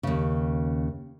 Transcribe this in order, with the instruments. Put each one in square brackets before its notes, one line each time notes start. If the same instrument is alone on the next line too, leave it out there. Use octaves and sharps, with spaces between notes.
[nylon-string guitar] D#2 C#3